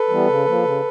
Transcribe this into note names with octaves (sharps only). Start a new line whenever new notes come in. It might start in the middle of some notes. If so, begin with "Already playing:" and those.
Already playing: A4 B4
E3 G3 B3
C#3
F3 A#3
C#3